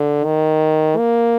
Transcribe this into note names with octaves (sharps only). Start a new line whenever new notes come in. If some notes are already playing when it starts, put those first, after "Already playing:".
Already playing: D3
D#3
A#3